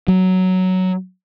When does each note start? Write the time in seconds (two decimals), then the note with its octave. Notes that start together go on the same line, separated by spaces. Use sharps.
0.08 F#3